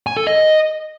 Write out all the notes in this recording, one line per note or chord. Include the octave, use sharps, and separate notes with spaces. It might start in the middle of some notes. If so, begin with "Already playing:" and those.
G#5
A4
D#5